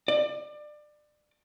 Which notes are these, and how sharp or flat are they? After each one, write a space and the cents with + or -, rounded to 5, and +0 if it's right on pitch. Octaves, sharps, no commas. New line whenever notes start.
D5 +25